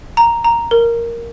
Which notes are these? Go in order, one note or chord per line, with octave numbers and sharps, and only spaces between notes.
A#5
A#5
A#4